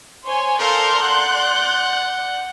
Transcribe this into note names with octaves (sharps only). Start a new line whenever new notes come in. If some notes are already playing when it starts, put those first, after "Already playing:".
C5 C#5 G#5 C6
A4 A#4 D5 F5 G6
F#5 F#6